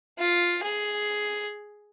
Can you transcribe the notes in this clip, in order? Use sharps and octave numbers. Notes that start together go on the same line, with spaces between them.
F4
G#4